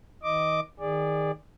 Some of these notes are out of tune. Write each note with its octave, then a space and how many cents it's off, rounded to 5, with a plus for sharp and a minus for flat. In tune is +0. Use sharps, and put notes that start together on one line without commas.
D#3 +45 D#5 +0 D6 +0
D#3 +0 G#4 -25 D5 +0